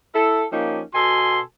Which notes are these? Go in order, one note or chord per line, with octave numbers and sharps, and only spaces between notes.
E4 A4
F3 A#3 C#4 D#4 G4
B2 F#4 A4 G#5 C6